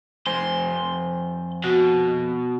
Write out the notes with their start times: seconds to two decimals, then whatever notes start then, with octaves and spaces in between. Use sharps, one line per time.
0.27 F2 C5 G#5 C6
1.64 B2 F#4